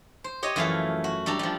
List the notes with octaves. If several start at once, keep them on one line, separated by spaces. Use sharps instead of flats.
C5
G4 C#5 D#5
F#2 E3 F3 A3 A4 F5
F#4
G3 D4 A4 A#5
F3 G3